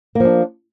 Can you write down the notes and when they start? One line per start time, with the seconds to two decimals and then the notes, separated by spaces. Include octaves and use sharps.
0.15 A#3
0.20 F3
0.25 D4